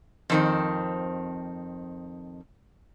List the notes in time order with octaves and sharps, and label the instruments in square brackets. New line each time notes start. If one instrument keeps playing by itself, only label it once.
[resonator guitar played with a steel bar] F2 D#3 C4